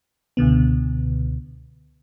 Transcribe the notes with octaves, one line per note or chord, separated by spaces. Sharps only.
C#2 B2 D3 B3